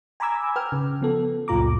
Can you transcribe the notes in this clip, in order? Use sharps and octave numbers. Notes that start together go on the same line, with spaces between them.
G#5 A#5 B5 D6 E6 G#6
B4 G5 F6
C#3
F3 B3 A4
C#2 F#2 A#2 F4 A#5 D6